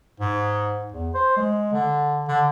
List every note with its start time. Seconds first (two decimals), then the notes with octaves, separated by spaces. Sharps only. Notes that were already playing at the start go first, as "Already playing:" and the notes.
0.20 G#2
0.92 E2
1.14 C5
1.37 G#3
1.73 D3
2.28 D3